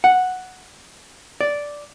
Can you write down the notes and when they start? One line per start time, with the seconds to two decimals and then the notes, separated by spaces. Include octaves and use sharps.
0.04 F#5
1.41 D5